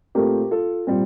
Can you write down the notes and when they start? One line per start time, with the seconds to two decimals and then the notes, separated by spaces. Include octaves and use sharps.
0.15 A#2 A3 C4 G4 A#4
0.51 F4 A4
0.87 A#2 G3 C4